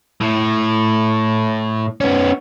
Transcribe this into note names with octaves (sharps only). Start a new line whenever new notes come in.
A2
B3 C#4